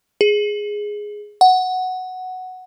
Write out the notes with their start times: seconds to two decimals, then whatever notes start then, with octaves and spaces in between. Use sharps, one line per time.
0.21 G#4
1.41 F#5